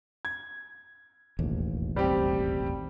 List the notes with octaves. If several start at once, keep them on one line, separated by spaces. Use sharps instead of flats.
G#6
E1 A1 D#2
G3 C4 G4